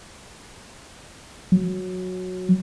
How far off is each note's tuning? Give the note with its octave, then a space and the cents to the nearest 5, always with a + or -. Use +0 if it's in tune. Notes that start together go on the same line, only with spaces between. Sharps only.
F#3 -10